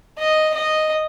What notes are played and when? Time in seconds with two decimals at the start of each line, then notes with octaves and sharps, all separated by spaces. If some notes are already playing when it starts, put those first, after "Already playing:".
0.18 D#5
0.54 D#5